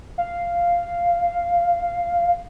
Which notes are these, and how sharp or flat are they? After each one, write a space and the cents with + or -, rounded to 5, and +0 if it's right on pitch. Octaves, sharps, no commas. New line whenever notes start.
F5 -5